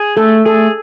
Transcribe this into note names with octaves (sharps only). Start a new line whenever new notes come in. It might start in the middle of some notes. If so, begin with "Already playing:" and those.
Already playing: G#4
A3 A4
G#4 A4